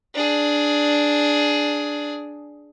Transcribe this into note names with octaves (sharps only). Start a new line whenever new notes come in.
D4 G#4